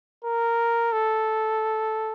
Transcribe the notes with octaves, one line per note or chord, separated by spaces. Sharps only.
A#4
A4